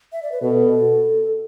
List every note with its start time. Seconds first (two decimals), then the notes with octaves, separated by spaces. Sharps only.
0.12 E5
0.22 D5
0.32 B4
0.42 B2 A4